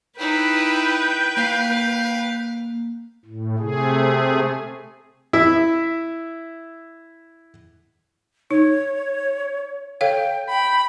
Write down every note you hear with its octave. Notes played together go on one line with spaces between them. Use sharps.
D#4 E4 B4 G5
A#3 F5
A2
C3 A3 G#4
E4 E5
D#4 C#5
A4 C#5 F5 G5
G5 B5